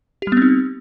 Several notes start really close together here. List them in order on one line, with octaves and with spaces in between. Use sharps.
G4 G3 B3 C4 D#4